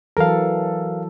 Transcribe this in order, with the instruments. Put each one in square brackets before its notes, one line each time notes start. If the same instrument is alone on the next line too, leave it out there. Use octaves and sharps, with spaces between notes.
[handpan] E3 F#3 A4 [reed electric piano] A#4 F5